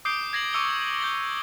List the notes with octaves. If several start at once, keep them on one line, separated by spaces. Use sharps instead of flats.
D6 D#6 G6 C7 D7 G7
G#6 A#6 C7 F#7
C#6 D6 E6 C#7 F7 G7
G6 A#6 G7